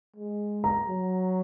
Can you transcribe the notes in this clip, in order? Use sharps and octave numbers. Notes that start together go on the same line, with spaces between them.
G#3
A#5
F#3